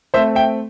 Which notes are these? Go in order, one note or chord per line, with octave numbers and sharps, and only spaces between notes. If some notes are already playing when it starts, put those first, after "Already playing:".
A3 C4 C5 E5
E5 G5